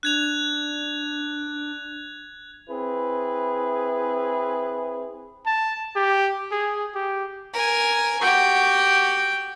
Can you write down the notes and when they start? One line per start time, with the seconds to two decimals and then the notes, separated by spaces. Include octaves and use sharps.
0.03 D4 F#6 G#6 F7
2.70 C4 E4 G#4 B4
5.46 A5
5.96 G4
6.52 G#4
6.95 G4
7.53 A#4 G#5
8.22 F#4 G4 G5